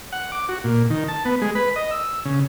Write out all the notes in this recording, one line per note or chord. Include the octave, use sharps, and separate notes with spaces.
F#5
D6
F#4
A#2
D#3
A5
B3
G#3
B4
D#5
E6
C#3